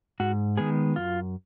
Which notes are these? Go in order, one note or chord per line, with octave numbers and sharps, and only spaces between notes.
G#2 F#4
D#3 G#3 B3 G#4
F#2 F4